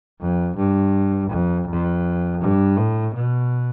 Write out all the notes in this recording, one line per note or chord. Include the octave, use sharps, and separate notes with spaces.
F2
G2
F2
F2
G2
A2
B2